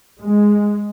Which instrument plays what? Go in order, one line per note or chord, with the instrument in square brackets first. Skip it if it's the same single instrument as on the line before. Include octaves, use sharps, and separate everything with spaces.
[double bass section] G#3